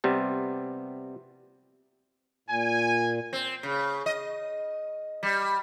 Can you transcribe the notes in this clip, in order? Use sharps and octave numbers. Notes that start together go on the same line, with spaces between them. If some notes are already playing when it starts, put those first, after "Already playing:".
C3 G3 B3
A#2 G#5
C4
C#3
D#5
G3